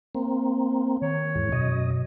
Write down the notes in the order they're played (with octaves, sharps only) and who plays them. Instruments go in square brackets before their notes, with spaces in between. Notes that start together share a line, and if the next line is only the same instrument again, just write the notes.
[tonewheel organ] A#3 C4
[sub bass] D#3 [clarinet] C#5
[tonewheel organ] E2 G#2
[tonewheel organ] F#2 D#5 [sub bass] B2